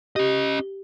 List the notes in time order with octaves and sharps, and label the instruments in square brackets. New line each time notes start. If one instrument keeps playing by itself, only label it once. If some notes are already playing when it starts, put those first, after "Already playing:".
[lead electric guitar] C#4 D#5 [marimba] G4